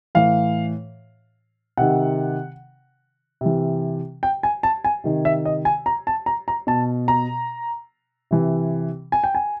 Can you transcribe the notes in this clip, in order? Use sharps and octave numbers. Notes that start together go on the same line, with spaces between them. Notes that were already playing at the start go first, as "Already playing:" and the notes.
A2 E3 F5
C3 D#3 F#5
C3 E3
G5
G#5
A5
G#5
C3 D#3
E5
D#5
G#5
A#5
A5
A#5
A#5
B2 A5
A#5
C3 E3
G#5
G5
G#5